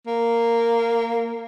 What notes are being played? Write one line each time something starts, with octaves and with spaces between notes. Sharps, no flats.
A#3